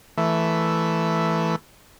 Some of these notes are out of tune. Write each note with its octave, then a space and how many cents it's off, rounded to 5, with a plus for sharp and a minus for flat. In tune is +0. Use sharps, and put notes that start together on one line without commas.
E3 +0 A3 +0 E5 +0